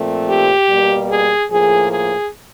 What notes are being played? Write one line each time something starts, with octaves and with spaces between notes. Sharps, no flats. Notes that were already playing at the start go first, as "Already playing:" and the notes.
Already playing: A#2 F3 A3 C4
G4
B2 G3 A#3
G#4
A2 F3 A#3 G#4
G#4